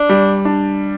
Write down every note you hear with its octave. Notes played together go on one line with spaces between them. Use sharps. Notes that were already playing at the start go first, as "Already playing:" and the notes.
Already playing: D4
G3
D4